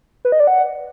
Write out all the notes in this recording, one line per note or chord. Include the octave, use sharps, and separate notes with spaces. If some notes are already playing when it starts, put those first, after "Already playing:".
B4
D#5
D5
F#5